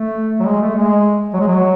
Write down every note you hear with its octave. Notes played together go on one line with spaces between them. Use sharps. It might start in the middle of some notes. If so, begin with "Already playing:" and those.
Already playing: A3
F#3
G#3
A3
G#3
F#3
G#3
F#3